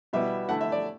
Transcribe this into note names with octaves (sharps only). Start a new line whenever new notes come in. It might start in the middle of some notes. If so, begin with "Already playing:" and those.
B2 G3 B3 E4 E5
D3 A3 E4 F#5
E5
D5